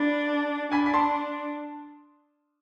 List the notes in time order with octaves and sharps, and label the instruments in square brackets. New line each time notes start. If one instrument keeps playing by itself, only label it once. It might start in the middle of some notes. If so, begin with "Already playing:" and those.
Already playing: [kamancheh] D4 [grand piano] B5
[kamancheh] D4 [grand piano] G#5 B5
[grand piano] B5
A5 C6